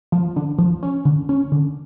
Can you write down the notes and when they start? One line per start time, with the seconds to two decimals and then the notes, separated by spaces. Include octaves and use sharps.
0.12 F3
0.36 D3
0.59 F3
0.83 C#4
1.05 D3
1.29 C#4
1.52 D3